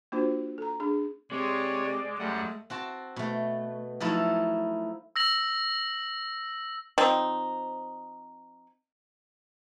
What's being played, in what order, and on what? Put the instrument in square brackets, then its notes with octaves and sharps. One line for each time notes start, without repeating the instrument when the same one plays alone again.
[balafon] A#3 D4 F4 F#4 C5
A4 A#5
D4 G#4
[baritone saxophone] C3 [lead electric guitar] G#3 [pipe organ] C#5 [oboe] D5
[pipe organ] F#2 G3 F#5 [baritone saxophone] A3
[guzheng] C4 F#4 A5
B2 A3
F3 F#3 A3 D#4 E4 A4
[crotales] E6 A#6 F#7
[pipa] F3 C4 D#4